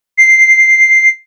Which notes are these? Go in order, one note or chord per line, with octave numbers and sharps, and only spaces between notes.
C7